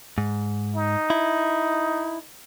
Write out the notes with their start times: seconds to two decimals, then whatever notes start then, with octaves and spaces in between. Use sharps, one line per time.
0.18 G#2
0.75 D#4
1.10 E4